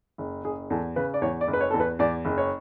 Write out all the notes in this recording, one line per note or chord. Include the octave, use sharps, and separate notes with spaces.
F#1
F#1 G#4
E2 A4
C#3 B4
D5
E2 C#5
D5
F#1
B4
C#5
E2 A4
B4
E2 D5
F#1
C#5